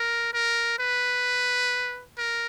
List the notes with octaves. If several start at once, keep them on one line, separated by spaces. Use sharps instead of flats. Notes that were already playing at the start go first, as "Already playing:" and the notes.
Already playing: A#4
A#4
B4
A#4